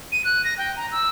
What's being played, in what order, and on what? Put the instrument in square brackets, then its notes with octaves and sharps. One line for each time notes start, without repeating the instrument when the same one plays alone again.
[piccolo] D#7
F#6
A#6
G5
A#5
E6